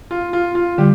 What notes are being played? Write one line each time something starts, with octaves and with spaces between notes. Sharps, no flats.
F4
F4
F4
D3 G3 G4